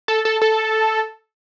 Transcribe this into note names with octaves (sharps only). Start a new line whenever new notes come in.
A4
A4
A4